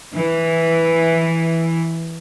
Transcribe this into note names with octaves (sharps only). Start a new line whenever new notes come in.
E3